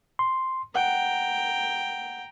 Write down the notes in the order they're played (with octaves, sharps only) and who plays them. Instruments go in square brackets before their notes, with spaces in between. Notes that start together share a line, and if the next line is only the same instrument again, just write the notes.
[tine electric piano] C6
[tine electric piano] F#5 [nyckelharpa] G5 A#5